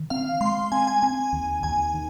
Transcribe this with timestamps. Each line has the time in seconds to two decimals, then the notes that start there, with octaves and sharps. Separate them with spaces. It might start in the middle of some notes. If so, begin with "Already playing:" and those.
Already playing: D#3
0.10 C4 F5
0.41 G#3 C6
0.72 C4 G#5
0.87 G#5
1.02 C4 G#5
1.33 D#2
1.63 D#2 G#5
1.94 D#3